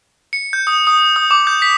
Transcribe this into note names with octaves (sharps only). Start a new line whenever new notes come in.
C#7
G6
D#6
D#6
D#6
D6
G6
B6